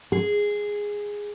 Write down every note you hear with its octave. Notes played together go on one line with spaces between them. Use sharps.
G#4